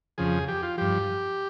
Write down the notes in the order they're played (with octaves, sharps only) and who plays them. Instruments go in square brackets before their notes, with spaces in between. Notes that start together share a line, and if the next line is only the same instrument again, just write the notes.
[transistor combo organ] F2 C#3 F3 G#4
G4
F4
G2 F3 G4